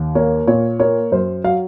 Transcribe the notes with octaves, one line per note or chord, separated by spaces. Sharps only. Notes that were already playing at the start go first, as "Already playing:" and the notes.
Already playing: D#2
A#3 C#5
A#2 C#5
A#3 C#5
F#2 C5
F#3 F5